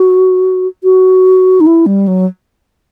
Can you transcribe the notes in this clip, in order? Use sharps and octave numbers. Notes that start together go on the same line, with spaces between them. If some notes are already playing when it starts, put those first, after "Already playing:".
Already playing: F#4
F#4
D#4
E4
G3
F#3